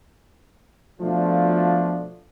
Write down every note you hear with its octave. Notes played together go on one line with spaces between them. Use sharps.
B2 F3 A3 D4 F4